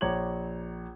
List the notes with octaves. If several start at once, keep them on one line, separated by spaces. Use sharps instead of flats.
A#1 C#5 A#5 D6 G#6 F#7